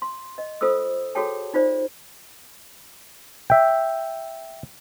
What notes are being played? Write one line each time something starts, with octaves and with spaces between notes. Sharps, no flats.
C6
D#5
F4 A4 C5 D#6 E6
F#4 G#4 A4 C#5 G5 A5
D#4 F4 C5 D5
E5 G5